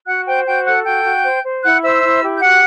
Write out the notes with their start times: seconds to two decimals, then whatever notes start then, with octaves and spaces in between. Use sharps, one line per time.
0.06 F#4 F#5 F#6
0.26 C5 G5 G6
0.46 F#4 G5 G6
0.65 A4 F#5 F#6
0.85 F#4 G5 G6
1.04 F#4
1.24 C5
1.43 C5
1.63 E4 F#5 F#6
1.82 C5 E5 E6
2.03 E4
2.22 G4
2.37 G6
2.41 F#4 F#5 F#6